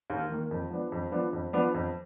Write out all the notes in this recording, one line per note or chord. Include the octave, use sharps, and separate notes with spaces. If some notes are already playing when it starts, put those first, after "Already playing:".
D#2
D#3 A#3
F2
F3 B3 D4
F2
F3 B3 D4
F2
F3 B3 D4
F2